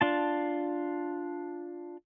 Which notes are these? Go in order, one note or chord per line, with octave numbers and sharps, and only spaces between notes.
D4 F4 A5